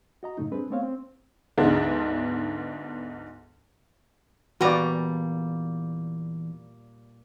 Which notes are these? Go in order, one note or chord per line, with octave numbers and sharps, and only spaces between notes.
F#4 D#5 A#5
F#2 A2 C#3 A3 D#4
G3 C4 D4 G#4 B4
A3 B3 C4 C#5 F5
C4
D2 G#2 B3 D4 D#4
E2 A#2 G3 F#4 B4 D5 A#5